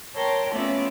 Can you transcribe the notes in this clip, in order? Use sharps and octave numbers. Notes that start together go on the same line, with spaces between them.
A#4 C#5 G5 A5 C6
A3 B3 C#4 F4 D5 E5